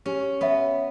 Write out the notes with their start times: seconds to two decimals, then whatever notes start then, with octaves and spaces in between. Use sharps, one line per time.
0.06 C#4 G4
0.41 B3 C#5 E5